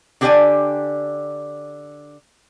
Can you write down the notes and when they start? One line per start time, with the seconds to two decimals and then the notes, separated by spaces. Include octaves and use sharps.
0.21 D3 D4 G4 B4 D5 G#5